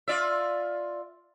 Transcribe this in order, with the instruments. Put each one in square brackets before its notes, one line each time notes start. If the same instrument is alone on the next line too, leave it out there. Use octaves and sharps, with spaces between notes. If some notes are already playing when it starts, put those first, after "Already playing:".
[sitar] F4 D5 E5